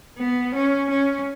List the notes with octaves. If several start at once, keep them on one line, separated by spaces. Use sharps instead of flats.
B3
C#4
C#4